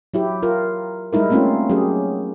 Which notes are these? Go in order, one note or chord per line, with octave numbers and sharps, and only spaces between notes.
F#3 E4 G4
F4 A#4
G3 G#3 D#4 E4 A#4
A3 A#3 C4 C#4 D#4 F4
F#3 C#4 G4 G#4